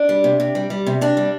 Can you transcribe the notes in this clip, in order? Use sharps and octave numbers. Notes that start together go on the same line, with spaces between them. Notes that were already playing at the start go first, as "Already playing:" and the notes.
Already playing: D4
G3
C3
C3
G3
G3
C3
C3 D4
G3